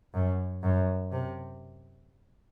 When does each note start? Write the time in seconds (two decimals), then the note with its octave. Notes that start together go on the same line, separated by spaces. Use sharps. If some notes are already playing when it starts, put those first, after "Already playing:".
0.14 F#2
0.63 F#2
1.11 C3